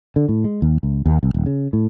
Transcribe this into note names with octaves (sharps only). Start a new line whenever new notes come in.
D3
A2
G#3
D#2
C#2
D#2
C2
D#1
C#3
A2